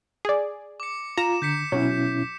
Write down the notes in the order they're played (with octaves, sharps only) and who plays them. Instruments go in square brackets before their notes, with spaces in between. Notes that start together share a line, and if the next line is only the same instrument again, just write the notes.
[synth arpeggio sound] G#4 D5
[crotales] D6 C#7
[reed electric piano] F4 [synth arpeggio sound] A#5 [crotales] E7
[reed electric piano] D3 [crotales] G6 B6 C#7
[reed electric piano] B2 C#4 E4 [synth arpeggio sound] F#3